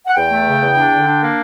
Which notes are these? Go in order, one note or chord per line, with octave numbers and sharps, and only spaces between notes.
F#5
E2 G5
A3
C#3
E2
D4
D3
D4
A#3